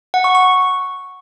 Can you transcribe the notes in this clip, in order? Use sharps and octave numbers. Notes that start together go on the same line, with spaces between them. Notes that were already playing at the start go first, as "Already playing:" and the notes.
F#5
C#6
C#6